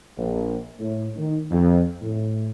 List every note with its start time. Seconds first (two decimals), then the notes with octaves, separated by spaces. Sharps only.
0.18 A#1
0.79 A2
1.16 D#3
1.51 F2
2.02 A2